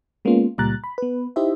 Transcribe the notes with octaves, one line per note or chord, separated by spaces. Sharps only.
G#3 A#3 B3 C#4 F4
C#2 A#2 G3 A#5 F#6 A6
B5
B3 B4
D#4 E4 G4 C5 D#5 E5